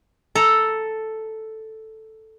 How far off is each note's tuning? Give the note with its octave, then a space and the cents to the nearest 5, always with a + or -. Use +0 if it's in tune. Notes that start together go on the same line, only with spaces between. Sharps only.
A4 +0 A#5 +0